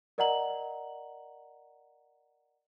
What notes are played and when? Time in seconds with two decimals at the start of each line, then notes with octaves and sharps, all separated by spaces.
0.18 A#4 D5 D#5 F#5 A#5 F#7